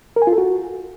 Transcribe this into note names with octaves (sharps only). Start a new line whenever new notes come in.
A#4
G#5
F4
A4
F#4